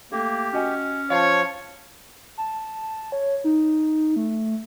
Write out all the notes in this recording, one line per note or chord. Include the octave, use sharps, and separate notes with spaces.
A3 A#3 G4
C#4 F#4 D#5 G#5
F3 F4 C#5 F5 A5 C6
A5
C#5
D#4
A3